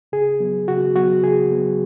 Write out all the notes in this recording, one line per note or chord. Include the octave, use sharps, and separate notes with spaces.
C#3 G#4
F#3 B3
C#3 F#4
F#3 B3 F#4
C#3 G#4
F#3 B3